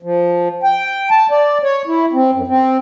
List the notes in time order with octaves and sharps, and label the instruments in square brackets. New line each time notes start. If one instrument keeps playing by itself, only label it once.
[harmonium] F3
G5
A5
D5
C#5
E4
C4
F#2
C4